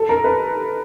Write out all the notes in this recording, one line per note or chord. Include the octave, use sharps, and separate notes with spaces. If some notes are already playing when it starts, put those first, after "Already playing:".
Already playing: A4
A#4
B4